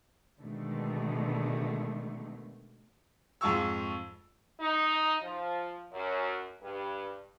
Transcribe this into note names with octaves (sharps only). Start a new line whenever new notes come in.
B2 D3 D#3 G#3 A3
F2 G#2 F4 A5 C#6 E6
D#4
F3
F#2
G2